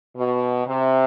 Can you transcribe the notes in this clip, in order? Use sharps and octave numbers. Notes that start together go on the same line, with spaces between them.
B2
C3